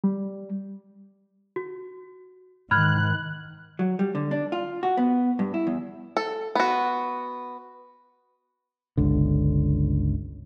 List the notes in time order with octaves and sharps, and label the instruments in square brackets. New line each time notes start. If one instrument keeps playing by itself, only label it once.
[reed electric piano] G3
[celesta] F#4
[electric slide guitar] G#2 [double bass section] D#3 [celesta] B5 F6 G#6 [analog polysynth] F#6
[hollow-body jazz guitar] F#3
G3
D3
D4
F4
F#4
B3
G2
E4
E2
[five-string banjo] A4
B3 F#4
[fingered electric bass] G1 C#2 D3